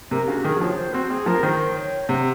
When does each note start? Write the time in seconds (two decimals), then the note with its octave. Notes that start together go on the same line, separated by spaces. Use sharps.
0.11 C3 A#4
0.28 C#3 F#4
0.44 D#3 G#4
0.56 F#3
0.60 F3 C#5
0.77 C5
0.94 C4 F#4
1.10 C4 G#4
1.26 F3 A#4
1.43 D#3 C5
1.76 C#5
2.08 C3 F#5